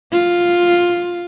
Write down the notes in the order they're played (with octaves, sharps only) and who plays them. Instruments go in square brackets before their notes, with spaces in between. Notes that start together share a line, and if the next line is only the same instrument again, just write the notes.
[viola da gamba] F4